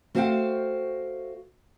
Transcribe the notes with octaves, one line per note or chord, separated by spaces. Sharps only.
A3 F#4 C5 E5 F5 G5